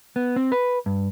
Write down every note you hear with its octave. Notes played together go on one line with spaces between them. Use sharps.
B3
C4
B4
G2